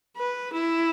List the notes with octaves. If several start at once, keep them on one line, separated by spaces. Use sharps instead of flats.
B4
E4